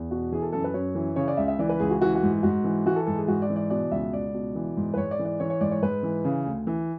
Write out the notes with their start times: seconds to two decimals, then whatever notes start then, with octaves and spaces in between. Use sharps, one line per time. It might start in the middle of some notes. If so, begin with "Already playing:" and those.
Already playing: E2
0.11 B2 F#4
0.32 E3 G#4
0.42 A4
0.53 F#2 A4
0.64 B4
0.74 F#2 C#5
0.95 E3
1.16 C#3 C#5
1.28 D5
1.37 C#2 E5
1.48 E5
1.59 E3 D5
1.69 B4
1.80 C#2 G#4
1.91 F#4
2.01 E3 F#4
2.15 F#4
2.23 G#2
2.43 G#2 F#4
2.64 E3
2.86 E3 F#4
2.96 A4
3.06 G#2 A4
3.18 G#4
3.28 G#2 F#4
3.42 D5
3.50 E3
3.56 D5
3.70 B2 D5
3.91 C#2 E5
4.13 C#2 D5
4.34 B2
4.55 E3
4.77 G#2
4.94 B4
4.97 G#2 C#5
5.11 D5
5.19 E3
5.25 D5
5.40 E3 C#5
5.50 C#5
5.61 G#2 D5
5.71 C#5
5.82 G#2 B4
6.03 E3
6.25 C#3
6.45 D2
6.67 E3